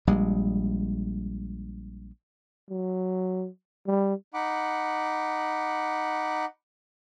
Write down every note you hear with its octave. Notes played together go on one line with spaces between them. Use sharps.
A#1 G3 G#3
F#3
G3
D#4 F#5 B5 D6